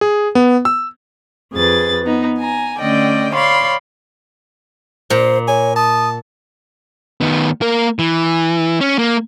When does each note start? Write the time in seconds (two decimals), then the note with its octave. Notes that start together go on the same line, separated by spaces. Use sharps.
0.01 G#4
0.35 B3
0.65 E6
1.54 F2 G#4 B4 A6
2.04 B3 D#4
2.38 G#5 A#5
2.80 D3 A3 C#4 D5 D#5 G5
3.35 C#5 D5 F5 B5 C6
5.10 A#2 C5
5.48 C#5 G#5
5.76 A5 D#6
7.21 D#3 B3
7.62 A#3 A#4
7.99 E3
8.81 C#4
8.99 A#3